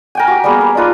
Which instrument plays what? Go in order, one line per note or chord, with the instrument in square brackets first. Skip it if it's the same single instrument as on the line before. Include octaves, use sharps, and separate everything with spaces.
[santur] A#4 G5 G#5
F#4 G4
G3 A#3 B3 G#4
A#4
D4 D#4 F4 B4